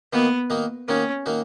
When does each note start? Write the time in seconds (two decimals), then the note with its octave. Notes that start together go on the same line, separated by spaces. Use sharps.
0.13 D#3 A#3 B3 D#4 F#4
0.50 D#3 A#3 D#4 F#4
0.88 D#3 A#3 C#4 D#4 F#4
1.26 D#3 A#3 D#4 F#4